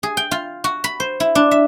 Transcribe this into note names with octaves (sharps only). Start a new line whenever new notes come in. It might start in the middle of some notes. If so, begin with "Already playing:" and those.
G#4
G5
F4
F#4
B5
C5
E4
D4
E5